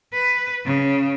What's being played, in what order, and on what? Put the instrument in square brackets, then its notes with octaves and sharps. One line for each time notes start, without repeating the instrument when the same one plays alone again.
[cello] B4
C#3